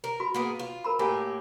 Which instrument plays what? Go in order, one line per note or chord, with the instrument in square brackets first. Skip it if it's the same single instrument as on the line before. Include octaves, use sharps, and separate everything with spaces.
[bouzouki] A#4
[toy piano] F#4 B5
[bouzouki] A#3 B3 G#4
F4
[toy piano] A#4 A#5 B5
[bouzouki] A2 A#3 G4 [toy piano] A#4 G#5